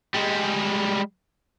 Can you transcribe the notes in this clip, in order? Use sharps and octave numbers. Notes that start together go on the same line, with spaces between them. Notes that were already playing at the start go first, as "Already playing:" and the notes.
G3 G#3